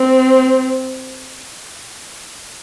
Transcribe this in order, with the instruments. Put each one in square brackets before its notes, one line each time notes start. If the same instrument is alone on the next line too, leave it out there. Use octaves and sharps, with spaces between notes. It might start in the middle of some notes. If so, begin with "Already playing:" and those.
Already playing: [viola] C4